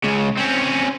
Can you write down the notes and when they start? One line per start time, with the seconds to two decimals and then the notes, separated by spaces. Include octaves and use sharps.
0.04 C#2 C#3
0.37 C4 C#4